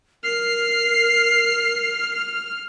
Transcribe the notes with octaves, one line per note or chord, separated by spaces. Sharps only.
A#4 F6 C7